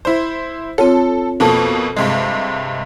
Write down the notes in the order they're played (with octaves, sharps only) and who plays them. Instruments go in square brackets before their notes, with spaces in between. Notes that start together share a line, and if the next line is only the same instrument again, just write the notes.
[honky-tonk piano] E4 C5
[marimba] C4 F4 C#5 [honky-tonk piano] A4
[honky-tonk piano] F2 B2 A#3 [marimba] A4 A5
[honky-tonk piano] G2 C3 G#3